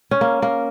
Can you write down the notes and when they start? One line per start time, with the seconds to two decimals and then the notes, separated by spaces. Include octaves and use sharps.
0.11 C#4
0.21 A#3
0.42 A#3